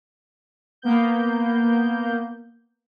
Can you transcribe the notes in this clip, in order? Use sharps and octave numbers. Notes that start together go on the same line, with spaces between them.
A#3 B3 G6